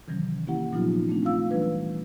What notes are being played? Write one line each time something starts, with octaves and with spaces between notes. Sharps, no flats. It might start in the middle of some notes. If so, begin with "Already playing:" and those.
C3 D#3 E3 F#3 C#4
A#3 C#4 E4 G4 F#5
A#2 F3 F#3 B3 D#4 F4
A3 C4 D4
F4 F5 E6
E3 F#3 G3 D4 B4